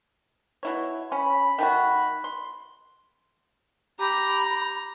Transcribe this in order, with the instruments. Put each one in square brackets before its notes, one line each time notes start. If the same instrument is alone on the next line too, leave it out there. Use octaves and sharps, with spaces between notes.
[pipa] B2 E4 C#5
[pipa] C#4 [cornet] B5
[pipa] D#3 A3 F#4
C6
[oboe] G4 [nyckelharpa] A#5 [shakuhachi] B5